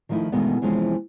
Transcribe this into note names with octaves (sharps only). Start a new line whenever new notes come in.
D#3 F3 A3 D#4 E4
B2 D#3 E3 G#3 A3 B3
C3 E3 F3 G#3 C#4